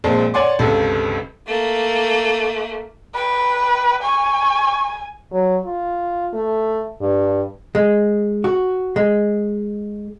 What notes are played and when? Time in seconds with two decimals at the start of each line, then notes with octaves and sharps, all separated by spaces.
0.04 A#1 A#2 G#3 C4 A5
0.34 C#5 D5 F#5 G#5 C6 D6
0.59 G1 C#2 C3 A4
1.48 A3 A#3
3.15 B4 G5
4.02 G#5 C#6
5.32 F#3
5.65 F4
6.34 A3
7.01 G2
7.75 G#3
8.44 F#4
8.96 G#3